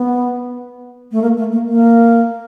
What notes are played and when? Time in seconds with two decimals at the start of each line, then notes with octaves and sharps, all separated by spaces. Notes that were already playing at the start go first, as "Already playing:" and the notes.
Already playing: B3
1.12 A3
1.22 A#3
1.37 A3
1.52 A#3
1.67 A#3